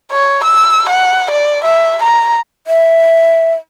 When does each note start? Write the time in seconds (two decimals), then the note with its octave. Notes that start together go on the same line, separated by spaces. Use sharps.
0.11 C#5
0.44 E6
0.89 F#5
1.31 D5
1.64 E5
2.03 A#5
2.67 E5